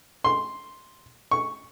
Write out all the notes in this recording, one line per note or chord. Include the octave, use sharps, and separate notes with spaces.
C6
C#6